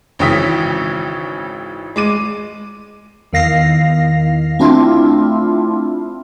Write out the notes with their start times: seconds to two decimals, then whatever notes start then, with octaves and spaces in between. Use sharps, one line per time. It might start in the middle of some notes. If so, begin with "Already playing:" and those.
0.19 G#1 C#3 E3 G5 D#6 B6
1.96 G#3 D6 D#7
3.33 E2 D#3 F5 A#6 C7
4.59 A3 C4 D4 E4 F4